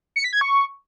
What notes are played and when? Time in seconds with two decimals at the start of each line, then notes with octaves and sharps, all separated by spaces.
0.16 C#7
0.24 B6
0.33 G#6
0.41 C#6